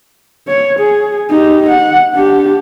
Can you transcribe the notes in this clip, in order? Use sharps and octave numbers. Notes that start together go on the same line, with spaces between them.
C#5
G#4
D#4 G4
F#5
D4 G4